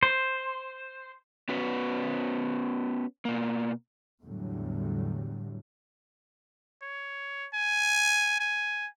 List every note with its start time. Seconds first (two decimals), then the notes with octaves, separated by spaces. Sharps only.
0.03 C5
1.49 B3 C#4 F#4 B4
3.25 B2 A#3
4.22 E2 A2 D3 F#3 G3
6.82 C#5
7.54 G#5
8.40 G#5